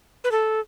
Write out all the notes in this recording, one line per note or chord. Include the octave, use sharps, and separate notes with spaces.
B4
A4